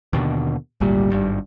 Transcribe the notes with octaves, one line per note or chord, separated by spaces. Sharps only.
D#2 B2 D3
G#1 D2 A#2 G3
G#1 G2